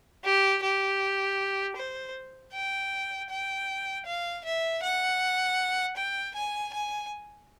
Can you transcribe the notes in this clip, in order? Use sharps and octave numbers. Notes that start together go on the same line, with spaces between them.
G4
G4
C5
G5
G5
F5
E5
F#5
G5
G#5
G#5